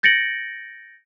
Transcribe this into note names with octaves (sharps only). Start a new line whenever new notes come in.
G6 A6 A#6 C#7 D7 F#7